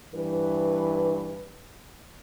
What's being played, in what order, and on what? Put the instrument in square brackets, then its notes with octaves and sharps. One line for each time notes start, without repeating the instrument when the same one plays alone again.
[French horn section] G2 E3 B4